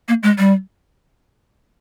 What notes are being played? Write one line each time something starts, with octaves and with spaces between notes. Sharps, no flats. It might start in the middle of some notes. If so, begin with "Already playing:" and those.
A#3
G#3
G3